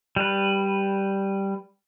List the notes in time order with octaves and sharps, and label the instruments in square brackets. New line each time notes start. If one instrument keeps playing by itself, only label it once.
[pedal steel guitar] G3 B4